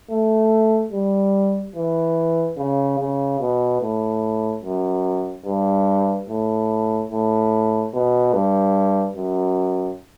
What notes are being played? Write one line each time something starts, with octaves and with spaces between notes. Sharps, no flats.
A3
G3
E3
C#3
C#3
B2
A2
F#2
G2
A2
A2
B2
G2
F#2